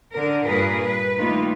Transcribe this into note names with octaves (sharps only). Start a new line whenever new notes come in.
D3 A#4
G2 A#2 G#4 A#4 B4
B4
D#3 G3 A3 A#3 F4 B4